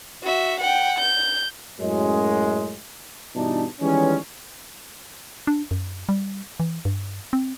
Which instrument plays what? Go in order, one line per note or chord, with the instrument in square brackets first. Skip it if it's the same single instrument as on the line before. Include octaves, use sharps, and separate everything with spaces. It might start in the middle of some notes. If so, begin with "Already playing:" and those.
[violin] F#4 E5
F#5 G5
G6
[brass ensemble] F#2 A2 G#3
G2 B2 E3 D4 D#4 A5
D#3 E3 G3 G#3 B3 C#4
[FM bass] D4
F#2
G3
E3
G2
C4